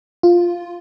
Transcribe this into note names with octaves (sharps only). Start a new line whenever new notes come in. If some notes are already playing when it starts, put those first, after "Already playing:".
F4